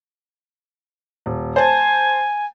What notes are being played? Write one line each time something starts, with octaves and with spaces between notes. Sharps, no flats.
D#1
C5 G#5 A5